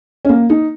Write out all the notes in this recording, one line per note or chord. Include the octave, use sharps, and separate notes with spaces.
C#4
A#3
D#4